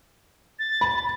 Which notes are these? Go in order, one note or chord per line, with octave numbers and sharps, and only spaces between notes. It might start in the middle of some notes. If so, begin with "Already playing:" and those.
A6
B5